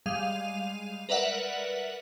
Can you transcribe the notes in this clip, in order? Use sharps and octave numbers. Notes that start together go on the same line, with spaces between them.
G3 G#3 F5 D#7 F7
A#4 B4 D5 E5 F#5